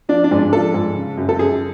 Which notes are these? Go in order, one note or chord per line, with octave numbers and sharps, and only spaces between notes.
F3 D4
D4
G#2
D4
F3 A4
G#2
C#3
F#2
A4
F#2 G#4